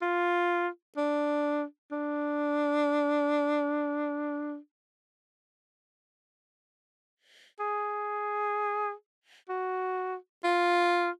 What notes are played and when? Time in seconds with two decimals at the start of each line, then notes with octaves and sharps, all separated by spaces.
0.02 F4
0.97 D4
1.92 D4
7.60 G#4
9.49 F#4
10.44 F4